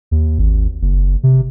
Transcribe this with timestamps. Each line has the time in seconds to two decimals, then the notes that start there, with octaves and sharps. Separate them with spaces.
0.11 D#2
0.38 G#1
0.82 F#1
1.23 C3